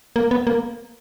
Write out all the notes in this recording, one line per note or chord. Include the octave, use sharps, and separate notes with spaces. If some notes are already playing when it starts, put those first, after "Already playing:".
A#3
B3
A#3